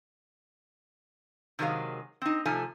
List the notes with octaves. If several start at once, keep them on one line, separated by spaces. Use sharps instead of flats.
C3 D#3 F#3 G#3 G#4 F5
C4 D#4
C3 F3 A3 D#4 G#5 A5